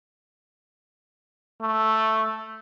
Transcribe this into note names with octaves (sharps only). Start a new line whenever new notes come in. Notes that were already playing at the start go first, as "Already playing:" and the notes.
A3